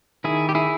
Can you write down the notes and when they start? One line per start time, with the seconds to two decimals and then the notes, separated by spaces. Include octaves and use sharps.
0.24 D#3 E4 G#4
0.49 G4
0.55 E4 G#4